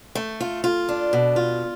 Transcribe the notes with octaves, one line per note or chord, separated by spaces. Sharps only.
A3
F4
F4
D4
B2
F4